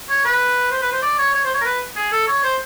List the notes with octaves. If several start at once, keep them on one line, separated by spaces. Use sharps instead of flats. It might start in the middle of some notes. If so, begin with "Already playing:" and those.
C#5
B4
C5
B4
C5
D5
C#5
C#5
C5
C#5
A#4
B4
G#4
A4
C#5
C5